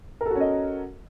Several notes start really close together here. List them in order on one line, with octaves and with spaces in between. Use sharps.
A#4 A4 F#4 C#4 D#5